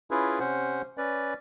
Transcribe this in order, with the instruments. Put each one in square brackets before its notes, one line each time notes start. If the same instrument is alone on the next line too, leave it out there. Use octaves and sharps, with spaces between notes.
[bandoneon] C#4 E4 F4 G#4 B4
C3 C#4 C5 F#5
C#4 B4 D5